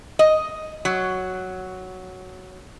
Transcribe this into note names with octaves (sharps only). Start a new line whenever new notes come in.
D#5
F#3